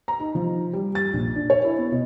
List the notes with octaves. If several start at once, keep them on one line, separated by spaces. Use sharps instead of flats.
A#5
D#4
F3
G3
A6
A#1
D4
C#5
E4
B3
B2